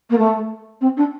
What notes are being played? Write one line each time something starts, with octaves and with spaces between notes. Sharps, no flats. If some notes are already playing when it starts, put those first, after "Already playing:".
A#3
A3
C4
D4